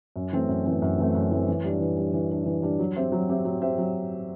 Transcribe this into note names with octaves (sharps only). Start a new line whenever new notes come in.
F#2
E3 A3 C4
F#2
E3 A3 C4
F#2
E3 A3 C4
F#2
E3 A3 C4
E3
G3 D4
E3
G3 D4
E3
G3 D4
E3
G3 D4
F#3
C4 G4 C5 E5
F#3
C4 G4 C5 E5
F#3
C4 G4 C5 E5
F#3